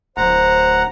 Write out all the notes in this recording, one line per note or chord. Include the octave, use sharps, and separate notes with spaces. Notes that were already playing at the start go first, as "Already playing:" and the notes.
D1 C5 F#5 A#5